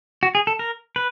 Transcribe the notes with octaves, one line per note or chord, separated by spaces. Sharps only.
F#4
G#4
A4
A#4
B4